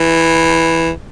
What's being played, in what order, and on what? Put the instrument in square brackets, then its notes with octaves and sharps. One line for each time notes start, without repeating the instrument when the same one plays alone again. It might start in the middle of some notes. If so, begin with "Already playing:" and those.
Already playing: [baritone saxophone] E3